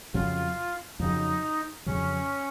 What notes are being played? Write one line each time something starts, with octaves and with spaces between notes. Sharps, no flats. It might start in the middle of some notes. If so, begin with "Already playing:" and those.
F2 C#3 F#3 F4
F2 C#3 F#3 D#4
F2 C#3 F#3 C#4